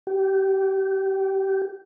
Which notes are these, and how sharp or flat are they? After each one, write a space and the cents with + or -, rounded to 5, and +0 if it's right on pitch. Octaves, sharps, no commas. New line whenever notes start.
G4 -25